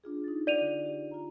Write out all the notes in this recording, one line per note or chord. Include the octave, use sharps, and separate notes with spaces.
D4 F4 G#4
D#4 A6
F4 B4 D5 F#5 D#7 F7
D3
D#4 G4
F4 A#5